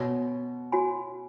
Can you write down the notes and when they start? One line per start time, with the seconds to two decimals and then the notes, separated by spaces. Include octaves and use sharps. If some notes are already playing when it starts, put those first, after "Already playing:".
Already playing: B2 F#4 C#5 G#5 B5
0.72 F#4 C#5 G#5 B5